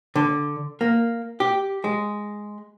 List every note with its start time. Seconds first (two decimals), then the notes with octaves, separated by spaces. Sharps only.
0.16 D3
0.81 A#3
1.40 G4
1.84 G#3